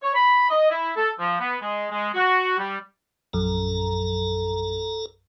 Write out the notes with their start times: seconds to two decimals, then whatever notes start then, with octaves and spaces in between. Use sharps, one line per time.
0.03 C#5
0.15 B5
0.50 D#5
0.70 E4
0.96 A4
1.19 F3
1.40 B3
1.62 G#3
1.91 G#3
2.14 F#4
2.58 G3
3.33 A#1 F#2 A4 A#5